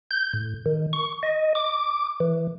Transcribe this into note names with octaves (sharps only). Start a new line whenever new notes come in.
G6
A2
D#3
C#6
D#5
D6
E3